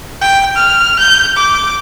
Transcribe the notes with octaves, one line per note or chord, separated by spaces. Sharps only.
G5
F6
G6
D6